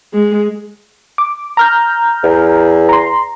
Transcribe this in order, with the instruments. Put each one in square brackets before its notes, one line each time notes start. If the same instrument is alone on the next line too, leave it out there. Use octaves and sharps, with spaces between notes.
[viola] G#3
[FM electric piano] D6
A#5 F6 G6
[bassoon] E2
[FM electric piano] A#5 C6